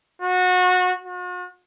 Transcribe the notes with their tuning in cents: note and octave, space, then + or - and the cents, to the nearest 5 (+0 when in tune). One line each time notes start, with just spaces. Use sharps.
F#4 -25
F#4 -45